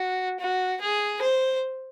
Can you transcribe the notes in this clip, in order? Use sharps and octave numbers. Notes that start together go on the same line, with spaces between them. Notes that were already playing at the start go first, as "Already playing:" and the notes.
Already playing: F#4
F#4
G#4
C5